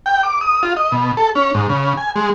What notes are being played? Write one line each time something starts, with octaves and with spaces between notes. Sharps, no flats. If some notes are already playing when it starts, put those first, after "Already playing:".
G5
D6
D#6
F4
D#5
B2
A4
C#4
G#2
C#3
G#5
G#3